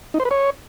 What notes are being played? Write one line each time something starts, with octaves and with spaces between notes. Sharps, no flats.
D#4
C5
B4
C#5